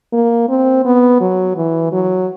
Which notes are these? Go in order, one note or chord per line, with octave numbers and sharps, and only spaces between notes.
A#3
C4
B3
F#3
E3
F#3